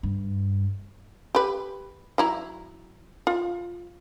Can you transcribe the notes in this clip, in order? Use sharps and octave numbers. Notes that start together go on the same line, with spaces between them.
G2
G4 B4
F#3 E4 A#5
F4